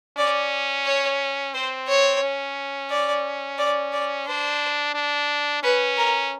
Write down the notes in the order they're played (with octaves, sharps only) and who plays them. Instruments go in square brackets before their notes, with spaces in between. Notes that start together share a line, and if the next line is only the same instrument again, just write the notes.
[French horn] C#4 [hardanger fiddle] D5
[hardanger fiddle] C#5
[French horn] C4 [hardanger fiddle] C5
[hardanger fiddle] C#5
[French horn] C#4
[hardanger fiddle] D5
D5
D5
[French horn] D4 [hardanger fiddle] C5
[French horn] D4
[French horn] C#4 [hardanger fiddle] B4
[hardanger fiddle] A#4